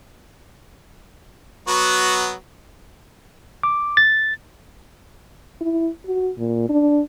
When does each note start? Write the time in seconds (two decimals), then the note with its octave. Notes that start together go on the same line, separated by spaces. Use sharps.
1.68 F#3 B3 F#4
3.63 D6
3.97 A6
5.61 E4
6.06 F#4
6.38 A#2
6.69 D4